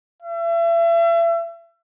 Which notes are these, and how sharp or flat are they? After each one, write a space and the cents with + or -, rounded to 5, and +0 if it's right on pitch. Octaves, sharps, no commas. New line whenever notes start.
E5 +35